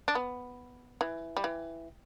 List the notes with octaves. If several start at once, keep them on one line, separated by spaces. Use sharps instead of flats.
D4
B3
E3
G3
E3